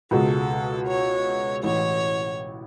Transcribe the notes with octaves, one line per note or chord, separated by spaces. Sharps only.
C#2 B2 G#3 A4
C#5
A1 A2 E3 C#5